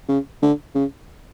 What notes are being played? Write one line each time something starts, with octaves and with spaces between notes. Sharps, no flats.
C#3
D3
C#3